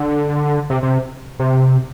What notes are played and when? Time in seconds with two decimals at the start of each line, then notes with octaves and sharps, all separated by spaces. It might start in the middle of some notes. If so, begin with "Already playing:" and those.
Already playing: D3
0.70 C3
0.83 C3
1.40 C3